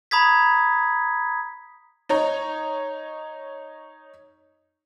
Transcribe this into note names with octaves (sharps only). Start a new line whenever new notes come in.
A#5 B5 D#6 G#6 B6
D#4 C#5 A#5